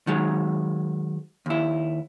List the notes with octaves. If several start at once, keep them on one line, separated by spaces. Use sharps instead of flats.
D#3 F#3 G#3
D#2 E4